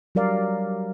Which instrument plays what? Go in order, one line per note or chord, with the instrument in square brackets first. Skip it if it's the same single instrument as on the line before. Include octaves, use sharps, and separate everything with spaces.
[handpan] F#3 G3 A#4 D5 F5